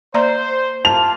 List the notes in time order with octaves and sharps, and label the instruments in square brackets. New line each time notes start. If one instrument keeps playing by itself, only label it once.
[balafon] A#3 D5 A#5 [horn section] C5
[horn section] A#3 F4 [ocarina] A5 [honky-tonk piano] F7